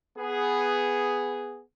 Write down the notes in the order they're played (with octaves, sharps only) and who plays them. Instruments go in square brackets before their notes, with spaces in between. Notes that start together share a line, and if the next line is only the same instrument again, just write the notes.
[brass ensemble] B3 G#4